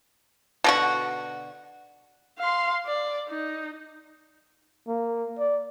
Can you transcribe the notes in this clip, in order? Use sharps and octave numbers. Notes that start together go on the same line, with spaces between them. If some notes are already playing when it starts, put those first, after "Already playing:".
B2 D3 F#4
F5 C6
D5
D#4
A#3
D5